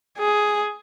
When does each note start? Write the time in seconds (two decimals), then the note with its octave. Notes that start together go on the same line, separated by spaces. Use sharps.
0.19 G#4